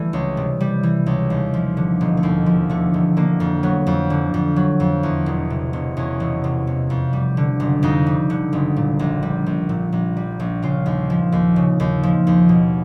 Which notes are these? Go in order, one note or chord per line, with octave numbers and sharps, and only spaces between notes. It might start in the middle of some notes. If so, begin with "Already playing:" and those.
Already playing: E3 G3 A3
C#2
C3
G3
E3
C#2
D#2
F3
D3
E1
A3
D#2 A#3
F3
D3 A3
E1
D3 A#3
F2
F#3 B3
F2
D3
F2
F#3
F2
E2
E1
C3
E1
E2 C#4
E1
C3
E1
F2
G3
D3
F#1
F2 D#4
G3
D3
F#1
A#2
A#1
G3
A#1
A#2
A#1
G3
A#1
C#3 F4
D#2
F3
D#2
C#3
D#2
F3
D#2
B2